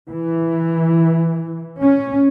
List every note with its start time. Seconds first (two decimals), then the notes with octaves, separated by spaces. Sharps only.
0.10 E3
1.81 C#4